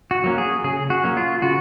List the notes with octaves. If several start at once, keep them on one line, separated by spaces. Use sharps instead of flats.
F#4
F#3 A#3 C#4
G#4
C#3 G#4
F#4
F#3 A#3 C#4
F4
C#3 F#4